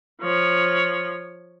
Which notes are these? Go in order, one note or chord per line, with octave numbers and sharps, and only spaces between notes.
F3 C#5